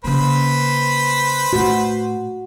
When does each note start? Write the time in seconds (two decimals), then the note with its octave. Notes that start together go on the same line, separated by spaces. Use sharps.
0.04 C#3 A#3 B4 C5 B5
1.53 A2 A3 F#4